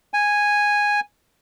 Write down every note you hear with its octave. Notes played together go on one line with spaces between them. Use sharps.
G#5